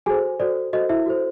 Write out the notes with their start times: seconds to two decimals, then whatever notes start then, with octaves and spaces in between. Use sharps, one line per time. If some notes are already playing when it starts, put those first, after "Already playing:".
0.06 F#4 G#4 A4 C5 G#5
0.40 F#4 A4 C5 D5
0.73 F#4 A4 C5 D#5
0.89 E4 E5
1.06 F#4 A4 C5